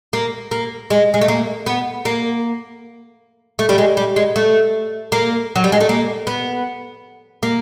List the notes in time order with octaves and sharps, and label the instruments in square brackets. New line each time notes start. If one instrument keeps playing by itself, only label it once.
[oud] A#3
A#3
G#3
G#3
A3
A#3
B3
A#3
A3
G3
G#3
G3
G#3
A3
A#3
F#3
G3
G#3
A3
A#3
B3
A#3